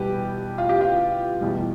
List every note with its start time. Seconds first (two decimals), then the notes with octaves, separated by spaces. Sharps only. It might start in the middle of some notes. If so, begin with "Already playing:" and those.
Already playing: E2 B2 G3 G4 B4
0.58 F4
0.69 G4
0.81 F4
1.41 E2 B2 G3